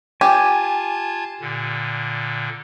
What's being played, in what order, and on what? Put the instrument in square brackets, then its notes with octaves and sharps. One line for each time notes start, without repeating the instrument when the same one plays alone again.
[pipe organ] F4 A5 G#6 [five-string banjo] G4 [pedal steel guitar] G#5
[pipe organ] A#2 D3